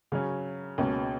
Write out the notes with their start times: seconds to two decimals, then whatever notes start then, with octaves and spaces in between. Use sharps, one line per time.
0.12 C#3 F#3 C#4
0.78 C#2 B2 A#3 C#4